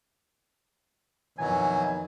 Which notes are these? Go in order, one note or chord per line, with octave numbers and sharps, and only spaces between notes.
F2 B2 D#3 E3 F#3 G#5